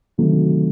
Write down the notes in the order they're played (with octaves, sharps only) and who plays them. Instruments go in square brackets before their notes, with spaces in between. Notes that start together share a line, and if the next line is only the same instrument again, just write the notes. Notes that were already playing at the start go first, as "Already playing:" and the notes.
[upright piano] D2 C3 D#3 F#3 A3